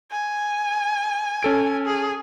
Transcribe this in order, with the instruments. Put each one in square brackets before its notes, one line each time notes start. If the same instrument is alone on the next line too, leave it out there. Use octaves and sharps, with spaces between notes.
[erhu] G#5
[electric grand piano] C#4 A4 D7
[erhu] G#4